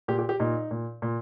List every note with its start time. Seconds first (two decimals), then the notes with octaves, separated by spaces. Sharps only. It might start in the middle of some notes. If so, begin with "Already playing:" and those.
0.08 A#2 G4
0.19 G4
0.29 G4
0.40 A#2 D#4
0.71 A#2
1.02 A#2